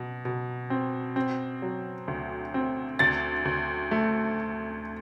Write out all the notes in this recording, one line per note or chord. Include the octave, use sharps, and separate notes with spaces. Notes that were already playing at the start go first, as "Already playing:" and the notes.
Already playing: B2
B2
C4
C4
F#3
D2
C4
D2 A6
D2
A3